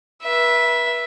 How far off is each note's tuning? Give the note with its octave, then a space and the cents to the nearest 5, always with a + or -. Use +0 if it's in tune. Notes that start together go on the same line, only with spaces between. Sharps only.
B4 -35 E5 +0